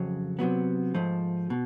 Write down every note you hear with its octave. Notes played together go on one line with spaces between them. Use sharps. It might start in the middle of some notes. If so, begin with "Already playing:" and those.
Already playing: F2 C#3 F#3
C3 D#3 F#3 B3
G#2 F3 A3
B2